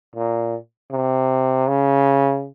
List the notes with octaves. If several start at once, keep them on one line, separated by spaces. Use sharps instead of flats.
A#2
C3
C#3